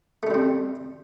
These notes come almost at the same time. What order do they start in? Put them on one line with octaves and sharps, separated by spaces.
A3 C#4 G3 C4